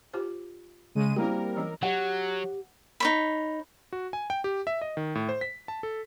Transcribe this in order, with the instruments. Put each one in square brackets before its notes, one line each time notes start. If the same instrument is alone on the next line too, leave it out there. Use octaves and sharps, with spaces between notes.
[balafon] F4 G4 C5
[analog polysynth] C#3 G#3 D#7
[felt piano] G3 A#3 C4 [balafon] C#4 E4 F#4 [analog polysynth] A#4
[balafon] E3 F#3 C#4
[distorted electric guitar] F#3 [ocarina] G4 [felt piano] C#5 F#5
[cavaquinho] D#4 C#5 B5
[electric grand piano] F#4
G#5
G5
G4
E5
D#5
D#3
A2
C5
B6
A5
A4